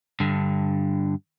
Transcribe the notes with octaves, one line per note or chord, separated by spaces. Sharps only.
G2 D3